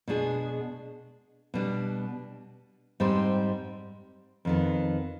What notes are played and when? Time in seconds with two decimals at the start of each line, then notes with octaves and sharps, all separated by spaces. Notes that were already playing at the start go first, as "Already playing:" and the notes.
0.08 B2 G#3 D4 G#4
1.54 B2 G3 D4
3.00 G#2 G3 C4 G4 C5
4.45 F2 D#3 B3